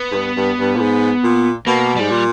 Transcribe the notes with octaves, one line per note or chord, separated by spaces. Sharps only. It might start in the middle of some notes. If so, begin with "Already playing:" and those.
Already playing: B3
G#2
G2
G2
G2
A#2
G#2
A#2
B2 A#3
G#2 G3
A#2